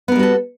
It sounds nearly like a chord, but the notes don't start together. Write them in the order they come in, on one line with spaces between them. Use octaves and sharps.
B3 A#4 G3 F#4 A4